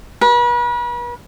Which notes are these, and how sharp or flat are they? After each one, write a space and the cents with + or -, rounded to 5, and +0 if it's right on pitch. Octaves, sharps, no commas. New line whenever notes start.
B4 -40